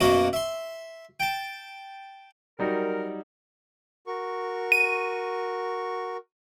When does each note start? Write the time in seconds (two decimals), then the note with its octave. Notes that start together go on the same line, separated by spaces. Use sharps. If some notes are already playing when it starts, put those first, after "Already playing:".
0.01 F#2 B2 A#3 F#4 D#5 D#6
0.33 E5 C6
1.20 G5 A5
2.59 F#3 G3 D#4 A#4
4.07 F#4 A#4 C#6
4.72 D#7